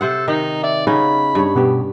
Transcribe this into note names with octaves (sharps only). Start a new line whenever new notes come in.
C3 A4 C5 F#5
D#3 D#4
D5 E5
C#3 B3 C#4 D#4 B5
G2 C#5
B2 B3 G4